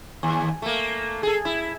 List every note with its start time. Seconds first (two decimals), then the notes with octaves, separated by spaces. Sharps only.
0.23 D#2
0.62 A3 A#3
1.23 G#4 A4
1.45 E4